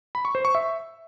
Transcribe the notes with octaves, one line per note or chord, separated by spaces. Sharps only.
B5
C#6
C5
C#6
E5